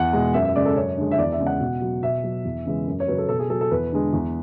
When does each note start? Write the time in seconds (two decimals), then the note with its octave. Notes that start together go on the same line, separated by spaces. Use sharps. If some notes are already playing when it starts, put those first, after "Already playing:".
Already playing: E2 F#5
0.13 B2 G#3
0.34 F#2 E5
0.45 E5
0.56 C#3 G#3 D5
0.66 A4
0.76 F#2 C#5
0.97 D3 G#3
1.11 E5
1.18 E2 D5
1.32 E5
1.40 C#3 G#3
1.46 F#5
1.61 B2
1.81 F#3
2.03 B2 E5
2.24 F#3
2.45 E2
2.66 C#3 E3 G#3
2.87 F#2
3.00 C#5
3.08 C#3 F#3 B4
3.18 A4
3.29 B2 A4
3.39 G#4
3.50 F#3 A4
3.61 A4
3.71 E2 B4
3.92 D3 G#3
4.13 E2